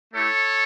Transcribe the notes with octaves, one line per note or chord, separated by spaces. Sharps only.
A3 E4 G4 A4 C#5